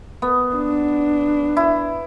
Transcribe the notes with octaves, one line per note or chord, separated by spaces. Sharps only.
B3
D4
E4